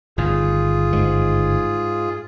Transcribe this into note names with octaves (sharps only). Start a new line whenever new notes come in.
G1 A2 D#3 F4 G#4
G#2